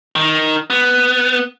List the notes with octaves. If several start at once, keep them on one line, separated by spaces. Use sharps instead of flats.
D#3
B3